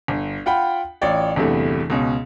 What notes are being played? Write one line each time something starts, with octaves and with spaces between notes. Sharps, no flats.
G1
F4 F#5 G5 B5
A1 F4 C#5 D5 G5
G1 E2 C3 A3 E4
C#2 B2 C#4